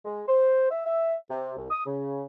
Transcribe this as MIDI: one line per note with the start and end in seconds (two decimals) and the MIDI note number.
0.05 0.22 56
0.28 0.70 72
0.71 0.83 76
0.86 1.15 76
1.29 1.53 48
1.57 1.67 36
1.70 1.83 87
1.86 2.24 49